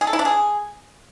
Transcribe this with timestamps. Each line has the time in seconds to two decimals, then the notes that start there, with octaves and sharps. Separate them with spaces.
0.01 G#4
0.07 A4
0.13 E4
0.19 D4
0.25 G#4